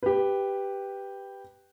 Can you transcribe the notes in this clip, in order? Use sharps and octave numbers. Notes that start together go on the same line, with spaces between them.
G4 B4